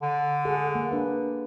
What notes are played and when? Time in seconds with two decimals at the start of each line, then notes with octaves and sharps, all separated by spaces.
0.02 D3
0.45 G#4 A4 F#5
0.75 A#3
0.91 D4 B4